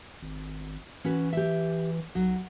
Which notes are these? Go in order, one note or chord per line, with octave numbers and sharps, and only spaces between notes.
G#1
E3 C#4 F#4 B4
G4 E5
B1 F#3